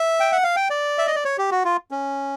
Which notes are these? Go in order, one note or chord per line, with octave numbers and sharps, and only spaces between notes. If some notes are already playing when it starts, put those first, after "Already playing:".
Already playing: E5
G5
F#5
F5
G5
D5
E5
D#5
D5
C#5
G4
F#4
F4
C#4